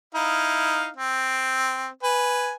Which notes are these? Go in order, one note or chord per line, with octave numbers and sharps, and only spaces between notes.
D#4 E4 F5
C4
B4 G#5